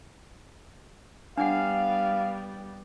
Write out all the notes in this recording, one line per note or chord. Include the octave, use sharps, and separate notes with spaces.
G3 B3 D4 F5 F#5